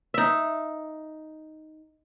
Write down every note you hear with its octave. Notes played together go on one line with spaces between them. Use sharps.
D#4 E5